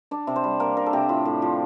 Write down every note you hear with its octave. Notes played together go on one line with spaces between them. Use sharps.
D4 D5
C3
C5
G3
A#3 A#4
D4 A#4
A4
C3 G4
A2 F4
A2
F3